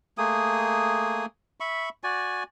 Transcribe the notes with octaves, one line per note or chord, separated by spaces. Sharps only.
A3 A#3 G#4 D#6
E5 B5 C#6
F#4 D5 G#5